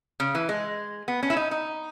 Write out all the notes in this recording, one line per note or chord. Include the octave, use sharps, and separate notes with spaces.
C#3
E3
G#3
B3
C#4
E4
D#4
D#4